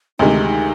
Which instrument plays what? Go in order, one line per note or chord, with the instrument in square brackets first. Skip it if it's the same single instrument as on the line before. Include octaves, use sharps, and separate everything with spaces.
[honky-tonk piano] D2 C3 D#3 G#3 [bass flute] D#4
[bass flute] D4
D#4